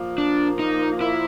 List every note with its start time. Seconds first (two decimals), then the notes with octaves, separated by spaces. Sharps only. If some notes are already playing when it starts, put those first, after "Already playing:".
Already playing: A#2 F3 A#3
0.18 D4
0.59 D#4
1.01 E4